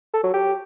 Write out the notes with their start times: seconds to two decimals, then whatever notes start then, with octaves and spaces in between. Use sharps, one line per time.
0.14 A4
0.24 F#3
0.34 G4